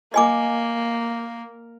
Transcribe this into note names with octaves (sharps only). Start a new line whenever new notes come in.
A#3 D#5 G#5 D6